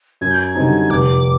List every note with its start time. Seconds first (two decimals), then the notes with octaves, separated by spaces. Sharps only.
0.21 F#2 G#6
0.31 G6
0.40 G#6
0.55 D3 G3 C4 D#4
0.90 F1 D6